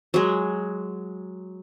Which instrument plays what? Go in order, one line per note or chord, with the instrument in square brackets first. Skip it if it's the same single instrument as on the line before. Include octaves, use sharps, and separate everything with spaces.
[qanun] F#3 G#3